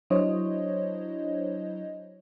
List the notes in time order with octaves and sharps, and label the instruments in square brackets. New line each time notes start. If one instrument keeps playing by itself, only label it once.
[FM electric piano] F#3 D4 E4 C5 C#5 D#5